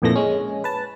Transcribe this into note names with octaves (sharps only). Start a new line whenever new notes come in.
A#1 F2 A#2 E3 A3 A#6
G#3 C#4
B4 A5